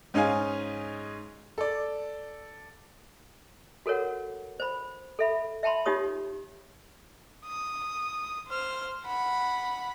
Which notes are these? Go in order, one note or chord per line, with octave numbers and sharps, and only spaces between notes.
G#2 C#4 D#4 G#4 F5 G#5
A4 D5
F#4 A4 A#4 C#5 F#5
C5 B5
A4 E5 B5
E5 G5 A5 B5 C6
D#4 F4 G4 C#5 D#6
D#6
C5 F6
F#5 B5